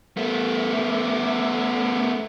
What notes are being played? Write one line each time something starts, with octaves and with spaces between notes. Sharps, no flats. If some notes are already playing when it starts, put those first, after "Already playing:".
A3 B3